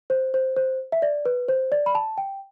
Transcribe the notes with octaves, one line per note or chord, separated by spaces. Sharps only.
C5
C5
C5
E5
D5
B4
C5
D5
B5
A5
G5